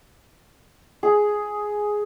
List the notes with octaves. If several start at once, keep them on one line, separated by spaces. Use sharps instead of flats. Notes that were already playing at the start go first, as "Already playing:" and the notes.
G#4